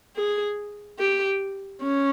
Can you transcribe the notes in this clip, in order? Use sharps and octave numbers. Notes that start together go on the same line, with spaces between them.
G#4
G4
C#4